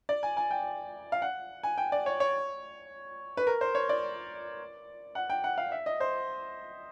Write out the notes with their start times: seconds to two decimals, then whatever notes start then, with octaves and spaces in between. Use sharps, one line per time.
0.09 D5
0.23 G#5
0.37 G#5
0.51 G5
1.12 F5
1.22 F#5
1.63 G#5
1.78 G5
1.92 D5
2.06 C#5
2.20 C#5
3.37 B4
3.47 A#4
3.61 C5
3.75 C#5
3.89 D5
5.15 F#5
5.30 G5
5.44 F#5
5.58 F5
5.72 E5
5.86 D#5
6.00 C5